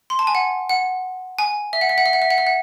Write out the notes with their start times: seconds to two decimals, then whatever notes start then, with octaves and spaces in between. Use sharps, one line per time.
0.10 C6
0.19 A5
0.27 G#5
0.35 F#5
0.69 F#5
1.39 G#5
1.73 E5
1.81 F#5
1.89 E5
1.98 F#5
2.06 E5
2.13 F#5
2.22 E5
2.31 F#5
2.38 E5
2.47 F#5